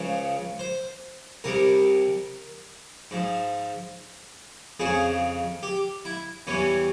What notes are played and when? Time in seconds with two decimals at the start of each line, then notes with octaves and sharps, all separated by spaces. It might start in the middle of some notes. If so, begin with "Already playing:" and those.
Already playing: C#2 C#3 F3
0.59 C5
1.44 C2 C3 G3 A#4
3.11 G#2 F3
4.80 F2 C#3 F3 G#4
5.63 G4
6.05 E4
6.47 E2 E3 G3 C#4